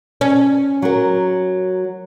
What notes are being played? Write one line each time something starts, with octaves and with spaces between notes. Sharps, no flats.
C#4
F#3 A#4